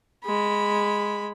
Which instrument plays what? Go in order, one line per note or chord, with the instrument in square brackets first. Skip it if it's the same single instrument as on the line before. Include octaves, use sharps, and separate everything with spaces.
[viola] G#3 B5